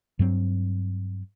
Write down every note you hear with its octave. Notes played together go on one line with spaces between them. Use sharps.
G2 F#3 C4